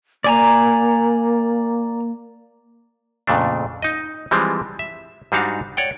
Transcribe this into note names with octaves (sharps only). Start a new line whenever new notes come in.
A#3 D5 G#5 A#5
F2 A#2 C#3 A3 D4
D#4 D#5
E3 F3 G3 G#3 C4
E5
G#2 G3 D4 D#4 F#4 F5
C#5 D5 F#5 G5